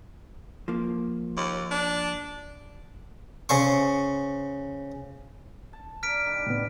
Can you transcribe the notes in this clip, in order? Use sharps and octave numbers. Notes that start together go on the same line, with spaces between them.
F3 A#3
D#2
D4
C#3 C5 C#6
A5
A#4 D5 A#5 F6 B6 D7
D#3 G3 D4
A2 C#3 B3